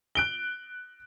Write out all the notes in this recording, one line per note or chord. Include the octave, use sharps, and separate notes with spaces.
F#6 D7 G7